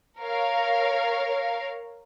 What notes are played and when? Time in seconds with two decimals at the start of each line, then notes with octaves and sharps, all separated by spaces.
0.19 A#4 C#5 F5